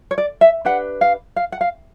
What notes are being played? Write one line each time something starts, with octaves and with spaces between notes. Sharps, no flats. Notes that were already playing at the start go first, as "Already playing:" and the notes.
C#5
D5
E5
D4 G4 B4 F#5
F5
F5
F#5
F5